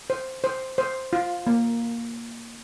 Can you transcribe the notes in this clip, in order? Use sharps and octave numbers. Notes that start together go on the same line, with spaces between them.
C5
C5
C5
F4
A#3